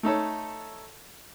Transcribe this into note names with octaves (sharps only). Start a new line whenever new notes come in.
A3 D#4 A4 C#5